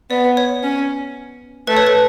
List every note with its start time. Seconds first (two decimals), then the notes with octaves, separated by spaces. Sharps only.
0.10 B3 D5
0.37 C#5
0.63 C#4
1.67 A3 B4
1.77 C#5
1.87 B4